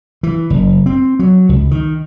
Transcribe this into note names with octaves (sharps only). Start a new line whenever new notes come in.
E3
F#1
C4
F#3
C#2
D#3